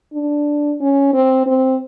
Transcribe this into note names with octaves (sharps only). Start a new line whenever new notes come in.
D4
C#4
C4
C4